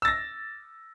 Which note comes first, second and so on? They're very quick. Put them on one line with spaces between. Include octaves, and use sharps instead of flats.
E6 A6 A#6